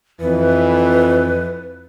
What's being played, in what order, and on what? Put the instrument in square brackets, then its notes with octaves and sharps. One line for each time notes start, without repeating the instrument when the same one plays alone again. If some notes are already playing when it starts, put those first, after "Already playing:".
[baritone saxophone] F2 [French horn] E3 [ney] B4